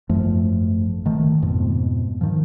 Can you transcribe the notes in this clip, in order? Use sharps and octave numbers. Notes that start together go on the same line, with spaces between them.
G#1 F#2 F3 A3
G#1 D#3 A3
F2 G#2 B2
D#3 F3